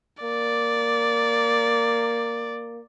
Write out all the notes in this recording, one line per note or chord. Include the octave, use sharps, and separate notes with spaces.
A#3 D5